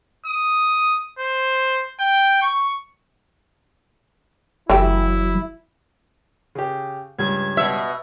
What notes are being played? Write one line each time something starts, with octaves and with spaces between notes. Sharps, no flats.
D#6
C5
G5
C#6
F#1 E3 F#3 A3 E4 G4
C#3 G4
C#2 G2 G#6
B2 E5